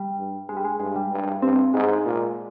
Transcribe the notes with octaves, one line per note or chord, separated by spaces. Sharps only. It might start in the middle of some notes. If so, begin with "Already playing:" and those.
Already playing: G3
G2
G2 G#3
G3
G#3
G2 G#3
G3
G2
G2 C4
G#2 G#3
A#2